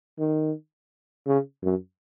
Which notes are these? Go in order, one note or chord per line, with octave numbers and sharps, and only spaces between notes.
D#3
C#3
F#2